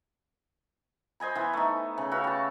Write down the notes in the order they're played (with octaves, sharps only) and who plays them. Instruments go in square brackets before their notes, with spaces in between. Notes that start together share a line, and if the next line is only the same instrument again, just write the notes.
[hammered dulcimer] C5 D#5 G#5 B5
E3 B3
A3 D#4
C#3
F#4 B4 E5 F5
G4 A5